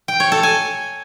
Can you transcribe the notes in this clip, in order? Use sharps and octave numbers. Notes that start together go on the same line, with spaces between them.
G5
C#5
A4
G#5